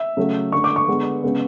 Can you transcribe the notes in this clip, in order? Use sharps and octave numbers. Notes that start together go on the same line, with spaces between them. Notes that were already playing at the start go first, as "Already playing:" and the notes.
Already playing: E5
C#3 F#3 A3
D3 A3 C#6
D6
C#6
D3 G#3 B3
C#3 G#3 B3